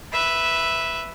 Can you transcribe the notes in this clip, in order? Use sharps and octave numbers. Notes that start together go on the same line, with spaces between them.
B4 E5